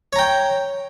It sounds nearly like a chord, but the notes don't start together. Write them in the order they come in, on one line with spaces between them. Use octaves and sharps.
C#5 A#5 G5